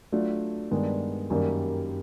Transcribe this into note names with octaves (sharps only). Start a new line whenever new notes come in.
F#3 A3 D4 F4
G2 D#3 G#3 B3 D4
F#2 D#3 G3 A#3